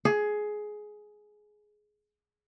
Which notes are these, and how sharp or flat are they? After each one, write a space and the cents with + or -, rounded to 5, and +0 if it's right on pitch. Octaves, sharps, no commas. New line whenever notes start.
G#4 +15